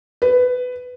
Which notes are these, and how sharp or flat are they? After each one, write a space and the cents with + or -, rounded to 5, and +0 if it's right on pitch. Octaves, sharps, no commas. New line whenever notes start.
B4 +15